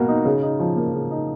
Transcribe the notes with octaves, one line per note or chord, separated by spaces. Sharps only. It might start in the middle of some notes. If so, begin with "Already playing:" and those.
Already playing: B2 A#3 F#4
D#4
C#3
D#4
F3
A#3
C#3
D#4